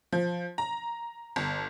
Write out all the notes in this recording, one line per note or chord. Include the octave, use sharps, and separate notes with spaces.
F3
A#5
G1